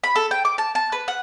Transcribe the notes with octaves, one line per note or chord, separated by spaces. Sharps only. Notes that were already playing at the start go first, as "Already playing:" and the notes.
B5
A4
G5
D6
A5
A5
B4
F#5